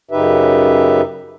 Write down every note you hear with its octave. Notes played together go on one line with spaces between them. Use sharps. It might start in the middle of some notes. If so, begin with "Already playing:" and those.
F#2 C#3 D#4 G4 B4 E5